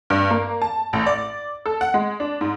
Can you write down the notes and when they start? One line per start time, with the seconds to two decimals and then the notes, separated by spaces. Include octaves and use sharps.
0.10 G2
0.30 A#3
0.62 A5
0.93 A1
1.06 D5
1.66 A4
1.81 F#5
1.94 G#3
2.20 D4
2.41 G#2